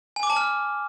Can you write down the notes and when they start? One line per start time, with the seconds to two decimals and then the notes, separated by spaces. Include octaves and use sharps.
0.16 G#5
0.23 D6
0.30 A5
0.36 F6